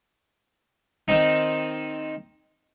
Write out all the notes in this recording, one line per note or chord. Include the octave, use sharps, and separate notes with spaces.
D#3 C4 D#4